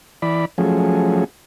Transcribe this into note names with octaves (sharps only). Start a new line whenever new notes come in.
E3 D5 B5
F3 F#3 A3 C#4 G#4